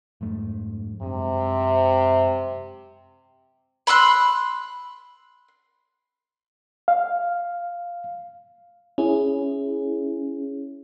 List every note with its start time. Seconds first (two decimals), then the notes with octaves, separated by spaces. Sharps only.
0.21 F2 G#2 A3
1.01 F#2 C3 G#3
3.87 B5 C6 E6 F#6
6.88 F5
8.98 C#4 E4 G#4